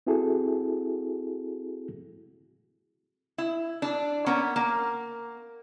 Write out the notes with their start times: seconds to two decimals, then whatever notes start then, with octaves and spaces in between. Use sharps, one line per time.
0.07 C4 E4 F#4 G#4 A4
3.38 E4
3.82 D4
4.26 A#3 B3 C#4
4.56 A#3